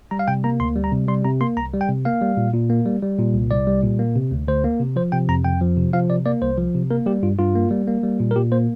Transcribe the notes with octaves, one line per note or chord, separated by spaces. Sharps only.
G3 A#5
F5
C3 G5
A#3 A#5
D2 C6
G3
A#5
C3
G3 C6
C3 A#5
A#3 C6
C2 A#5
G3
G5
C3
A#3 F5
G3
A#2
A#2
A#3
G3
G3
A#2
C2
C2 D5
G3
A#2
A#3
C3
D2
D2 C5
A#3
C3
F3 C5
C3 G5
F2 A#5
F2 G5
F3
C3
F3 F5
C3 D5
A#3 D5
C2 C5
F3
C3
A#3 A#4
G3 G4
G2 F4
G2 F4
A#3
G3
A#3
G3
A#2
A#4
A#2 G4
A#3 C5